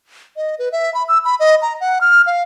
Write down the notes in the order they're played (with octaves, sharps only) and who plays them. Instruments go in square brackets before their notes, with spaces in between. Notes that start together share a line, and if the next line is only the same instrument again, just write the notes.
[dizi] D#5
B4
E5
B5
E6
B5
D#5
A#5
F#5
F6
F5